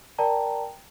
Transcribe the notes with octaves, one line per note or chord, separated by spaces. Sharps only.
A#4 D5 G5 A5 A#5